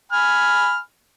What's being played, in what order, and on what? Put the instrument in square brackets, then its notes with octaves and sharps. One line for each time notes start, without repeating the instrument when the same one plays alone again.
[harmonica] G#5 B5 F6